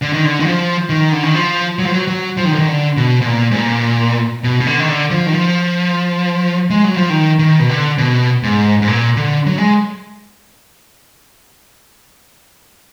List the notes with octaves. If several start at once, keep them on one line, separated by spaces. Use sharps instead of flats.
D3
D#3
D3
D#3
F3
D#3
D3
D#3
F3
F#3
F3
F#3
F#3
F3
D#3
D3
D#3
D3
B2
B2
A#2
G#2
A#2
B2
B2
D3
D#3
D3
F3
D#3
F3
G#3
F#3
F3
D#3
D#3
B2
D3
B2
G#2
G#2
A#2
D3
F#3
G#3